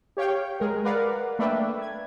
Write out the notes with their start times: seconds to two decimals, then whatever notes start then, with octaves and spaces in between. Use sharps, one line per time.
0.17 G4 C#5 F5 G5
0.60 G#3 A#4
0.85 A#4 B4 D5 F5 F#5
1.39 A3 A#3 D4 B4 E5 G5
1.82 G#6